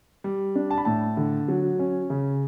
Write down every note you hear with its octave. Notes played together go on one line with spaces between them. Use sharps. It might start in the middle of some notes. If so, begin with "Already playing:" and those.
G3
D4
A5
B5
A2 A5
D3
F#3
C#4
C#3